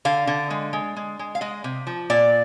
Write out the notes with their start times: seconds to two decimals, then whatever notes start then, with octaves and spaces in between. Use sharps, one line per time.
0.05 D3 F5
0.27 D3
0.50 G#3
0.73 G#3
0.96 G#3
1.19 G#3
1.35 F5
1.41 G#3 D#5
1.64 C3
1.87 F3
2.10 A#2 D5